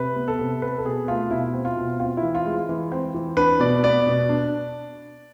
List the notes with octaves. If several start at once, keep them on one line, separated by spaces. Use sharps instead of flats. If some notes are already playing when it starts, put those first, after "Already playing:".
Already playing: C3 B4
B3
A4
C3
C4 B4
A4
B2 G#4
A3 F4
B2 E4
C4
F4
B2
C4 F4
E4
E3
F4
G#3
E3
C4
E3
D4 B4
B2 D5
B3 D5
B2
D4